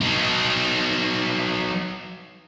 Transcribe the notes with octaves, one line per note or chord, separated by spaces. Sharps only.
F#3 D#4